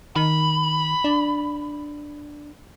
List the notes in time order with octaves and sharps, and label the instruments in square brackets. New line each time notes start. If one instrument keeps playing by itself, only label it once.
[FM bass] D#3 [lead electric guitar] B5
[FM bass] D4